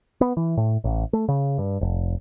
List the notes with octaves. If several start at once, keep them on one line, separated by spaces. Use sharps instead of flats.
B3
E3
A2
A1
A3
C#3
G2
F1